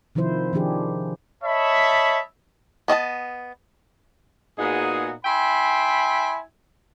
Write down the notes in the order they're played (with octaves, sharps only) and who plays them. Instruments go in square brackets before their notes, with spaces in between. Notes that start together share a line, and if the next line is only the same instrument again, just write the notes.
[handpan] C3 D#3 F3 E4 C5
D#3 F3 D4 G4 G#4
[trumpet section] C#5 D#5 E5 A5 B5
[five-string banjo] B3 D#5 E5 A5
[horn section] A#2 B3 D#4 F#4 G#4
E4 E5 G5 G#5 B5 C6